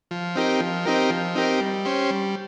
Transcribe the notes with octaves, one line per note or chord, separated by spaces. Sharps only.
F3
C4 D#4 G4 A#4
F3
C4 D#4 G4 A#4
F3
C4 D#4 G4 A#4
G3
C#4 G4 C5
G3